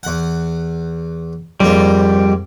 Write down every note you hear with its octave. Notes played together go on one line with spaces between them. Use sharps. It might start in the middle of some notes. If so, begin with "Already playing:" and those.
E2 F#5
F2 G#2 G3 A#3